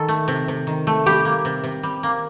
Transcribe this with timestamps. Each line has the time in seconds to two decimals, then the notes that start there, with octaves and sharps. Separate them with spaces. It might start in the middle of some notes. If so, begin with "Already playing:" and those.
Already playing: D#3 A4
0.08 A3
0.28 C3
0.48 C3
0.67 D#3
0.87 A3
1.06 G3 G4
1.25 A#3
1.45 C3
1.64 C3
1.83 G3
2.03 A#3